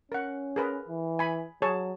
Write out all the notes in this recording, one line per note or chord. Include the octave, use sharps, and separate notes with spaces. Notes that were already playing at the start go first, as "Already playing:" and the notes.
C#4 A#4 F#5
G#4 A#4 B4
E3
G#5 B5
F#3 G#4 C#5 A5